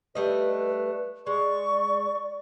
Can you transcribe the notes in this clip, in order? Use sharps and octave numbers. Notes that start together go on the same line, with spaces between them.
G3 A3 B4 D#5
G#3 D5 C#6